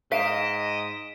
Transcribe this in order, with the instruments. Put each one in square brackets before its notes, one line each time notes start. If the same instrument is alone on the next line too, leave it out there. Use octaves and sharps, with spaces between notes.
[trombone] G#2 [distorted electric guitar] D#5 [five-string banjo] F5 [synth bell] B6 D7 E7